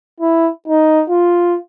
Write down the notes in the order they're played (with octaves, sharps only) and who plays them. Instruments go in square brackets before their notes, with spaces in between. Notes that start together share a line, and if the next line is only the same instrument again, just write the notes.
[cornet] E4
D#4
F4